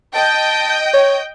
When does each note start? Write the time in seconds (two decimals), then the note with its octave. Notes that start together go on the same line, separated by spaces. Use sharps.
0.15 D#5 G5 A5 G6
0.94 C#5